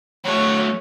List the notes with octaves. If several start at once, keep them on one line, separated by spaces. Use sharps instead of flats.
F#3 A3 C#5